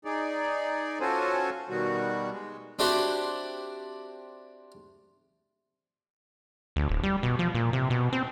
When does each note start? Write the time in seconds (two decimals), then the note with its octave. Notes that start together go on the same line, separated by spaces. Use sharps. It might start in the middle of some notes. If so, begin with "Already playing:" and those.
0.05 D#4 G#4 D5
1.01 C#4 F4 F#4 A4 C5 G#5
1.69 B2 D#3 G3 F#4
2.31 G#3
2.79 C4 D4 E4 F#4 G4 C5
6.76 D2
6.89 D1
7.03 G3
7.23 B2
7.39 F3
7.55 A#2
7.73 C3
7.90 B2
8.13 C4